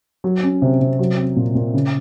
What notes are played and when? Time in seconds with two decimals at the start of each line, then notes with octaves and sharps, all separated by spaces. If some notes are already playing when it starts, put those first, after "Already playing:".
0.24 F#3
0.43 C#4
0.62 C3
0.81 C3
0.99 F#3
1.18 C4
1.36 A#2
1.55 A#2
1.74 C#3